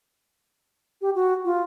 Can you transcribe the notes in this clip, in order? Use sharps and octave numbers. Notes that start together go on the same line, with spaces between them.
G4
F#4
F4